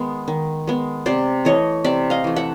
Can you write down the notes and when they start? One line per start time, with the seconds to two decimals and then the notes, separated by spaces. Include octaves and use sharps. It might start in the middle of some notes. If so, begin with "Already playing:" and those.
Already playing: D#3 G#3 B3
0.28 D#3
0.67 G#3 B3
1.06 C3 C5 D5
1.45 E3 A3 C#5 D#5
1.84 C3 D5 E5
2.10 D#5 F5
2.24 E3 A3
2.36 E5 F#5